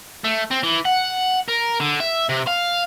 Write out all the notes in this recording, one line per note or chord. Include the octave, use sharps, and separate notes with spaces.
A3
C4
E3
F#5
A#4
D3
E5
C3
F5